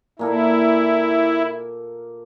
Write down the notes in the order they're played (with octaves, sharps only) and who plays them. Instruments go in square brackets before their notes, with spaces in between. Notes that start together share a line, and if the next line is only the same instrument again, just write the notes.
[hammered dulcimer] A#2 A#3 A4 [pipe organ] E4